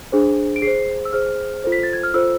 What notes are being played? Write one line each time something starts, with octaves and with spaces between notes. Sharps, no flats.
D4 G#4 C5
D7
G#4 C7
C5
E6
G#4 C5 F6
F4 A4 C5
B6
A6
G#6
F6
F4 A4 C5 E6